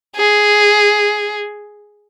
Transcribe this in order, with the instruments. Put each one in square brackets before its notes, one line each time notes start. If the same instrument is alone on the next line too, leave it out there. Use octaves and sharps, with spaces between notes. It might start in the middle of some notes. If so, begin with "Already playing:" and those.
[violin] G#4